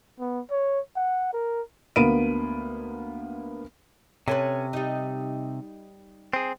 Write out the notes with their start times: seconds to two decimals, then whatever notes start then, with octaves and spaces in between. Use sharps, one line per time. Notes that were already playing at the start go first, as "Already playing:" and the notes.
0.19 B3
0.51 C#5
0.96 F#5
1.33 A#4
1.96 D2 A#3 B3 B5 D7 D#7
4.28 C3 C#4 A4 B4
4.73 G3 D#4
6.33 C4 G#4